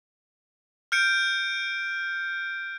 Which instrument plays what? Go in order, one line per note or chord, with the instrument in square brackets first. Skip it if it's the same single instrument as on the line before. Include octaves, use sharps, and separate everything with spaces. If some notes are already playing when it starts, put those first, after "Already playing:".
[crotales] F6 G6 C#7 D7